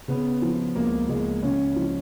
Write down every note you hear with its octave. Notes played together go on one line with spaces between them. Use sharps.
C#3 B3
F3
C#2 A#3
C#2 G#3
C#3 C#4
F3